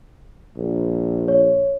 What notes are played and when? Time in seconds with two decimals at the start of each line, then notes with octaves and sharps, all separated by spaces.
0.57 A#1
1.28 C#5